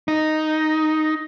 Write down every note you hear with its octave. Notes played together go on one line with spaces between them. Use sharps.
D#4